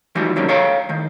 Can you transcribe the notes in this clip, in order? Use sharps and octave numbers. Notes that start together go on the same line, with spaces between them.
E3 F3 G3 A3 D#4 F#4
C3 D#3 F#3 G3 A#3 C#4
A4 C#5 F5 G5 A#5
A2 D#3